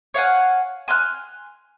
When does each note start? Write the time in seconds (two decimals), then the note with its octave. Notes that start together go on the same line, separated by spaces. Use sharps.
0.14 C#5 F5 F#5 G#5
0.88 G#5 C6 F6 F#6